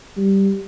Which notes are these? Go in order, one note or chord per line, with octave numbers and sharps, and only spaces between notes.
G3